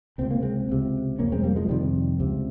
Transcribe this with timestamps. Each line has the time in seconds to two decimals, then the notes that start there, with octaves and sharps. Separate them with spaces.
0.18 C#2 C3 C4
0.31 A#3
0.42 G#3 C4
0.69 C#2 C3
1.19 F2 C3 A#3 C#4
1.32 G#3 C4
1.44 G3 A#3
1.56 F3 G#3
1.69 F2 C3 D#3 G3
2.20 C#2 C3